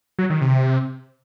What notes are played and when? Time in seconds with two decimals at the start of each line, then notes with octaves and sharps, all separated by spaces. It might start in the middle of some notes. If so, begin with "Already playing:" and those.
0.19 F#3
0.30 D#3
0.41 C3